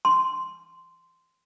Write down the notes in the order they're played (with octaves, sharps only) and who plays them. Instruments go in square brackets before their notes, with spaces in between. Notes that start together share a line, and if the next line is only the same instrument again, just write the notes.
[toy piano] C6